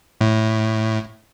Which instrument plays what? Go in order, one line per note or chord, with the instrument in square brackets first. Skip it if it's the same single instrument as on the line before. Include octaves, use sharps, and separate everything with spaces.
[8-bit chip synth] A2